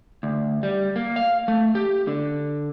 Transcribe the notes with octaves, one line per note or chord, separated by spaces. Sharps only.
D2
G3
A#3
F5
A3
G4
D3